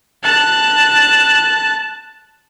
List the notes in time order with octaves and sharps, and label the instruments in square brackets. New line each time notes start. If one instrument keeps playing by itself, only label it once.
[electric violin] A5 F#6